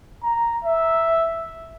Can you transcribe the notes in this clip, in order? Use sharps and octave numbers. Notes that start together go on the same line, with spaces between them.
A#5
E5